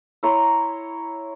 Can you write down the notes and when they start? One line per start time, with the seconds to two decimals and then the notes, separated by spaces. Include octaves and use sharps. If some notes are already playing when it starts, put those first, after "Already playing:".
0.23 E4 C#5 A#5 C6